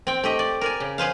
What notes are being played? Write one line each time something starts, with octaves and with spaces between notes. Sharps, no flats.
C4 G5
A3 G4 D#5
D5
A#4 D5 G#5
C#3
G#4 B4 C5 F5